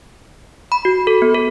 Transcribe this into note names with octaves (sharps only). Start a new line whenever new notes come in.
B5
F#4
A4
B3
A4